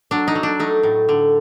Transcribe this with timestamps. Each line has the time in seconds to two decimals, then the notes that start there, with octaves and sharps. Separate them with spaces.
0.11 F#3 D4
0.28 D#4
0.35 F#3
0.43 D4
0.59 A3 D#4
0.83 A2
1.09 D3